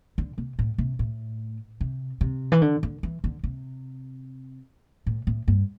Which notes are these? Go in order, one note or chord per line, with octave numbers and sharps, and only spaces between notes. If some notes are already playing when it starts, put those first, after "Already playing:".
D3
C3
A2
C3
A2
C3
C3
E3
D3
D3
E3
D3
C3
A2
A2
G2